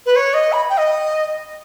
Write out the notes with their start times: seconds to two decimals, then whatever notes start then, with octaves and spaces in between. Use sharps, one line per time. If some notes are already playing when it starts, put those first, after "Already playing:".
0.06 B4
0.16 C#5
0.34 D#5
0.52 B5
0.69 G5
0.77 D#5